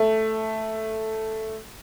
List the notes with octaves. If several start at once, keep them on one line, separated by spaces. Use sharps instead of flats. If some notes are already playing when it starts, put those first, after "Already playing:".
Already playing: A3